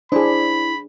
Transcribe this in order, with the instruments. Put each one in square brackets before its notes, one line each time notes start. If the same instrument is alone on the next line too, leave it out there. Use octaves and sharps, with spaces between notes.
[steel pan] D4 G#4 [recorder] E4 [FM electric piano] C5 [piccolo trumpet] B5